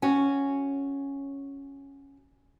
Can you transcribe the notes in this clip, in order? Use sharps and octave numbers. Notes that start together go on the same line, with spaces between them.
C#4 F#4